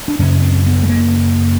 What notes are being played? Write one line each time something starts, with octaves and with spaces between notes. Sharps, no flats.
D4
F#2 C#3 C#4
C4
B3
A3
A#3